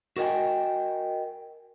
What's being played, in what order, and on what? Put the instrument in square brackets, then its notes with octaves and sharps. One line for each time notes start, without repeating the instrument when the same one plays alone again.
[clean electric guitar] F#4 A#4 D#5 G5 G#5